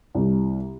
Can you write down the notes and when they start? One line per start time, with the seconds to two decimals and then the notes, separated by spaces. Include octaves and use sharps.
0.15 C2